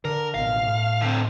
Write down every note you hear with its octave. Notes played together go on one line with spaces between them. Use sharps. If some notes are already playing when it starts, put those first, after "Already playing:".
D3 A#4
A1 B2 F5
A2
D3 C4